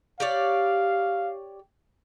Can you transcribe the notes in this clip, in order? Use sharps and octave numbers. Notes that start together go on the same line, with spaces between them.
G4 C#5 D5 F5